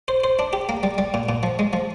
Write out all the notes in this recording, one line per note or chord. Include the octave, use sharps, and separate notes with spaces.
C5
C5
D4
G4
A#3
G3
G3
A#2
A#2
F3
G#3
F3